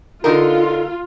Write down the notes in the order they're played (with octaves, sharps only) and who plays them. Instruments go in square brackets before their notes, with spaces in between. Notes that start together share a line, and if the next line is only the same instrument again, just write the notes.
[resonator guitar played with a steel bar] D3 D#4 A#4 [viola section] F4